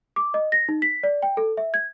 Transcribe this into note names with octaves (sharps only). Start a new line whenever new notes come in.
D6
D#5
A#6
D#4
B6
D5
G5
A4
E5
G#6